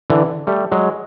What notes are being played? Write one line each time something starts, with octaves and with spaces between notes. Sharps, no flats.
D3 E3
G3 A3
F#3 G#3